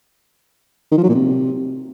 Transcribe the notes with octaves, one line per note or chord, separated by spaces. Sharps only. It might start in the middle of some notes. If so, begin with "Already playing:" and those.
D#3
F3
F#3
A#2
C3